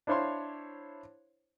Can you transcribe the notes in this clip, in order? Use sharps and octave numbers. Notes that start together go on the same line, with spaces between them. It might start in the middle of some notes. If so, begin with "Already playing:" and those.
D4 E4 C5 C#5 F5 C6